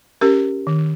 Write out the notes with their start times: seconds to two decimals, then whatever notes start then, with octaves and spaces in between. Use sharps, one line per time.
0.21 C#4 G4 A#4
0.67 D#3